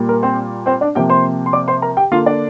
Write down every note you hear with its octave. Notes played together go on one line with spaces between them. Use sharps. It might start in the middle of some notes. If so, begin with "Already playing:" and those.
Already playing: A#2 G3 A#3
A#4
C4 C5
C4 C5
D4 D5
C3 F3 A#3 G4 G5
C5 C6
C6
D5 D6
C5 C6
A#4 A#5
G4 G5
D3 A#3 F4 F5
D4 D5